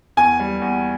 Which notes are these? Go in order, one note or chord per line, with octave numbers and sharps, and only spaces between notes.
E2 G#5
G3
E2